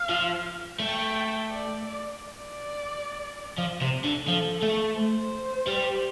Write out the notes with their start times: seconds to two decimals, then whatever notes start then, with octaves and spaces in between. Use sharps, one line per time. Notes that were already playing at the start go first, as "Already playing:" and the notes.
Already playing: F5
0.09 F3
0.79 A3 G5
1.49 D5
2.19 D5
3.58 F3
3.81 C3
4.04 D3
4.28 F3 A4
4.62 A3
4.98 C5
5.67 G3